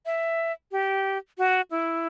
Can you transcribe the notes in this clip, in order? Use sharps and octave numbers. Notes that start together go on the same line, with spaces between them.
E5
G4
F#4
E4